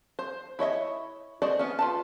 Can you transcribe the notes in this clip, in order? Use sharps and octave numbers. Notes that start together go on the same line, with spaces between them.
C5
E4 C#5 D#5 E5
F#4 C5 D5 D#5
B3 C#4
F4 B4 A5